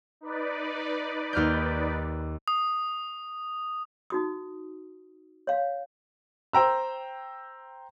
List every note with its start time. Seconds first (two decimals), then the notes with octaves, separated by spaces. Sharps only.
0.21 D#4 B4 D5
1.33 D#2 F6 G6
2.48 D#6
4.10 D#4 F#4 D#6
5.47 C#5 F5
6.53 C5 G5 A#5 E6